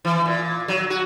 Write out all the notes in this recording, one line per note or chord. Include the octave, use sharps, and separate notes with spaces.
E3
A#2
F#3
F#4